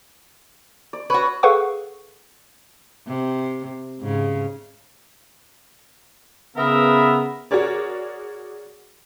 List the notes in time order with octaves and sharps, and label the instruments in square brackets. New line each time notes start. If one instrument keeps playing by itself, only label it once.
[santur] D5
[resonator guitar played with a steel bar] F#4 B4 [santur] C#5
[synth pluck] G#4 A4 B4 F5 F#5 C#6
[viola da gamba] C3
G#2 C#3
[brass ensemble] C#3 B3 [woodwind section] A#4 D#5 E5
[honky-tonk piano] F#4 G#4 A#4 C#5 D5